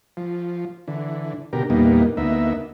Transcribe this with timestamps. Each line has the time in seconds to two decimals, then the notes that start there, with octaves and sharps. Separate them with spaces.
0.17 F3
0.88 D3 E3
1.53 B2 D3 G4 A#4
1.70 E2 A#2 G3 A#3 B3 D#4
2.17 D2 A#3 B3 D#4 E5